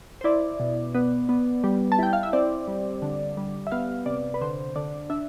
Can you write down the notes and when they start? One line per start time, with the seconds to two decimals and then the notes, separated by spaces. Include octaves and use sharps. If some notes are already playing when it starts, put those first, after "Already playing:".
0.21 C5
0.24 E4 D5
0.60 B2
0.94 B3
1.29 B3
1.64 G3
1.92 A5
1.99 E4 G5
2.13 F5
2.23 E5
2.33 C4 D5
2.68 G3
3.02 D3
3.37 G3
3.67 E5
3.72 B3 F5
4.06 C3 D5
4.34 B4
4.41 D3 C5
4.76 D3 D5
5.10 D4 E5